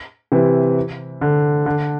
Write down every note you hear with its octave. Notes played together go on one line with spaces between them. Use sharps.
C3 E3
D3
D3